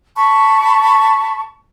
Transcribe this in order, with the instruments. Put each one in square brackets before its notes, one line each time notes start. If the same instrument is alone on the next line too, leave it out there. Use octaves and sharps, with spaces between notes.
[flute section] A5 B5 C#6